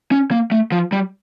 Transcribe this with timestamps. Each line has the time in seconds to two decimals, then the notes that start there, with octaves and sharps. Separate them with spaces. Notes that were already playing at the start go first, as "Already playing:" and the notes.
0.12 C#4
0.31 A#3
0.52 A3
0.72 F3
0.92 G3